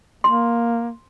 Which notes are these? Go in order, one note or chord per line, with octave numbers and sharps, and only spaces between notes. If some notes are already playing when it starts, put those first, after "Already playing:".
A#3 C6